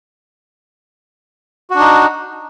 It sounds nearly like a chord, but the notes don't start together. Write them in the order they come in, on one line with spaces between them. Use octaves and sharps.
F#4 D4 D#4